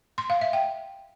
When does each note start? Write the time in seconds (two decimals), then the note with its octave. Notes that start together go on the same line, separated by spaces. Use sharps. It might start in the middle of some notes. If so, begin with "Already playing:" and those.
0.18 C6
0.30 F5
0.41 E5
0.53 G5